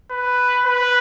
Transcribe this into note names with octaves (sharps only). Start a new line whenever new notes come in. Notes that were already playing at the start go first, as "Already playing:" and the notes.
B4
B4